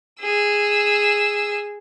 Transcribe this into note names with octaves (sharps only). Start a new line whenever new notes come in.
G#4 E6